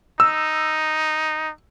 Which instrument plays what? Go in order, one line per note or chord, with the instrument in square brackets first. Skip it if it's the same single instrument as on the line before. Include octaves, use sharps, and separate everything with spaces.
[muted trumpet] D#4 [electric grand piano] E6